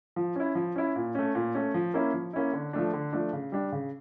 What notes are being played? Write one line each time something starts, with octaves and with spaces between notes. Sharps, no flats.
F3
C#4 E4
F3
C#4 E4
A#2
A3 C#4
A#2
A3 C#4
F3
A#3 C#4 E4
F3
A#3 C#4 E4
D3
F3 A3 D4
D3
F3 A3 D4
C#3
G3 D4
C#3